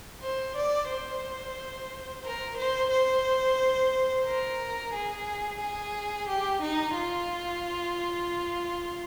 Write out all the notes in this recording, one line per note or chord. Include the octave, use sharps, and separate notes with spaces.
C5
D5
C5
A#4
C5
C5
A#4
G#4
G#4
G4
D#4
F4